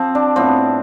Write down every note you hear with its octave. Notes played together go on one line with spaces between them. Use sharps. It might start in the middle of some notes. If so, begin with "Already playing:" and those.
Already playing: F3 C4
D4
A2 F3 B3 C4